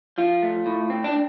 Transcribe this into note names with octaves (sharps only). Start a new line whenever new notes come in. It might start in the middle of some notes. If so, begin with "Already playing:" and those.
F3 F4
A3
A2
C4
D4